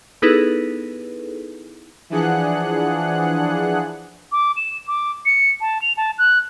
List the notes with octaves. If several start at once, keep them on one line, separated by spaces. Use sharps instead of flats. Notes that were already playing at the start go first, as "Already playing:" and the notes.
B3 D#4 E4 G#4 A4 B4
E3 F3 D4 G#4 F#5 F#6
D6
E7
D6
C#7
A5
F7
A5
F#6